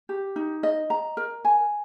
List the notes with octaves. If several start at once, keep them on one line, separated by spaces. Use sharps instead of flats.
G4
D#4
D#5
A#5
A#4
G#5